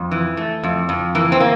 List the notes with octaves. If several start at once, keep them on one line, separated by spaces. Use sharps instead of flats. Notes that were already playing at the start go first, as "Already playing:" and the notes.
Already playing: F2
E3
A3
F2
F2
E3 A#3
C4
A#3